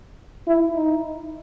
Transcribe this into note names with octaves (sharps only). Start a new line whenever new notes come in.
E4
D#4